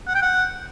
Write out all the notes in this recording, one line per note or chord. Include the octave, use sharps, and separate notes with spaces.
F#5
G5
F#5